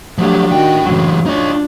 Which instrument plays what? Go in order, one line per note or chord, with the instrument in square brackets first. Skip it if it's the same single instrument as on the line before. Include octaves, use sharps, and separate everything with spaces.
[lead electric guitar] F3 F#3 [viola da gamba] A3 D4 G4
[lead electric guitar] A2 G5 [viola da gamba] D#3 F#4
[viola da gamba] F#2 A2 C#3 [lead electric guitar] E3 F#3
[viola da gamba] D4 F4 [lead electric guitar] D#4 C#5